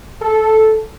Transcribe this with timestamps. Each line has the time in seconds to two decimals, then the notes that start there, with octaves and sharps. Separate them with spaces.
0.20 A4